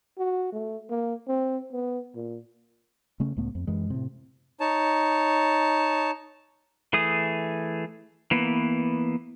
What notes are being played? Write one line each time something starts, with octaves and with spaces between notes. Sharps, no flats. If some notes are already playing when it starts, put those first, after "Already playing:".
F#4
A3
A#3
C4
B3
A#2
C#3 A3 C#4
C#2 A2 A3 B3
F2
F#2 E3 G#3
A2 C3
D#4 C#5 A5
E3 A3 G#4 D#6
E3 A#3 B3